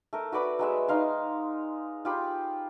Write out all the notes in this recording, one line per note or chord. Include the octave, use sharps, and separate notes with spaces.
A3 A#4
F#4 B4 D5 B5
F#3 G#3 E5
D#4 F5 C6
F4 G4 B5